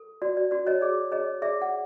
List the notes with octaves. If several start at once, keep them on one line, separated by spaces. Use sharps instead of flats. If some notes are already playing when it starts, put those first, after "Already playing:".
Already playing: A4
F#4 D5
D5
F#4 D5
C#5 D#5
G#4 D5
G#4 C#5 D#5
G#4 D5 E5
F#5